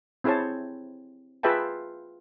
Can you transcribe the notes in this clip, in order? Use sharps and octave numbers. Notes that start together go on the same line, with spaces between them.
C4 E4 G#4 C5 C#5 A5
F4 G#4 B4 E5 G5 A5